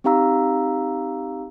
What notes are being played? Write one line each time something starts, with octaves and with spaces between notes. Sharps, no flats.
C4 D#4 G4 F5 A#5 E6